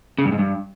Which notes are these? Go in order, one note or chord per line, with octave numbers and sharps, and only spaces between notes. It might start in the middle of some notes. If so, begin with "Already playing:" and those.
C#3
G2
G#2
G2